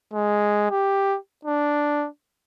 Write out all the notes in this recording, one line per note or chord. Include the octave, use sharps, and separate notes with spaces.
G#3
G4
D4